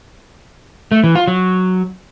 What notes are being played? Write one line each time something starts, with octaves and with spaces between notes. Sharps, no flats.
A3
E3
F4
F#3